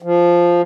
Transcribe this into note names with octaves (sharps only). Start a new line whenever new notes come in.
F3